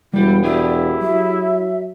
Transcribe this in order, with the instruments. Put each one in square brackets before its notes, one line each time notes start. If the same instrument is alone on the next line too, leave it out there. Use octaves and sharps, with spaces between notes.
[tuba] E1 [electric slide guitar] G3 G4 [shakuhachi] E4
[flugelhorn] E4 [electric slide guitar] G4 G#4 [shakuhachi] D5
[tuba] F#3 [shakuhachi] E5